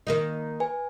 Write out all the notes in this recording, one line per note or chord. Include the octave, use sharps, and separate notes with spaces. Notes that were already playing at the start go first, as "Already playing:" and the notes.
D#3 A#3 D#4
B4 G#5